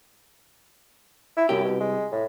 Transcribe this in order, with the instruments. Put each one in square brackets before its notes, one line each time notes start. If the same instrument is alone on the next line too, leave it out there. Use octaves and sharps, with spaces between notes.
[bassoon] E4
[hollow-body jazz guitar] C2 G4 [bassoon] F#2
[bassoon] B2
G#3
A2